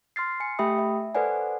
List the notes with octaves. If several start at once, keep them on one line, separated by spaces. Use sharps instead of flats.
C6 F6 A6 C7
G#5 C#7
A3 G4 E5 G5 B5 D#6
E5
A4 B4 C5 D5 F#5 G#5